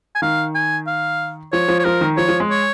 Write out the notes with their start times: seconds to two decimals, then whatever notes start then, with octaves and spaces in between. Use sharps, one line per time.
0.15 G#5
0.22 D#3 F5
0.55 G#5
0.87 F5
1.52 F3 C#5
1.68 F3
1.79 C#5
1.85 F3 A#4
2.01 D#3
2.17 F3 C#5
2.29 F3
2.40 G#3
2.50 C#5